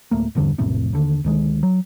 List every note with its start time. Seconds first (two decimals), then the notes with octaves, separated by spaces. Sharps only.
0.11 D1 A3 A#3
0.35 D1 E2 G2 D3
0.58 B1 F2 A2 C3
0.93 D#2 D3
1.24 D2 D#3 G#3
1.63 F#3